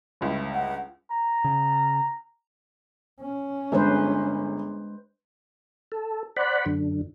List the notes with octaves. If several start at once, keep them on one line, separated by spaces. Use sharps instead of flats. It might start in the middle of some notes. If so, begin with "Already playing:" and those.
G1 C#2 E4
F#5
A#5
C#3
C#4
G1 G#3 B4 C5
A4
C5 D5 F#5 B5
F#2 D3